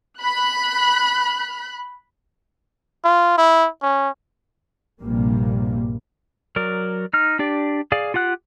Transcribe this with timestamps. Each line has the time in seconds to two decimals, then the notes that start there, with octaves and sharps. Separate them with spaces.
0.19 B5 F#6
3.04 F4
3.38 E4
3.82 C#4
5.02 A#1 G2 C3 G3 A#3
6.56 F#3 A#4 D5
7.13 D#4 F6
7.39 D4 G4 D5
7.92 G#4 D5 F5
8.14 F4 G4 F#5 F#6